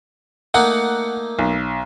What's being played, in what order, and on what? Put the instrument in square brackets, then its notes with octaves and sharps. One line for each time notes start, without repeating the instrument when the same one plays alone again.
[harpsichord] A3 A#3 D#4 [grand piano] F#5
[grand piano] B1